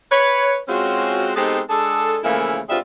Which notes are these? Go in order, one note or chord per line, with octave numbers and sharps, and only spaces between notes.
B4 C#5
G#3 C4 C#4 F4 F#4
G#3 B3 C4 D#4 G4 A4
G#3 D4 G#4 A4
C#3 E3 F3 A3 A#3 E4
G2 G3 G#3 C4 F4 E5